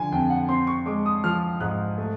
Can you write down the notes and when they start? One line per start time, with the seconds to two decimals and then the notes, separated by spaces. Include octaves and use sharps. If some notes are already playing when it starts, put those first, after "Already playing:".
Already playing: D3 F3 G#5
0.12 F2 G5
0.30 F#5
0.49 C4 C6
0.67 C#6
0.86 G#3 D6
1.06 D#6
1.24 F3 F6
1.60 G#2 F#6
1.98 A3